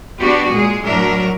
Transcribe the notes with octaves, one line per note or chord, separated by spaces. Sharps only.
B3 D4 F#4 G4
A#2 G#3 G#4
A2 F#3 D4 A#4 E5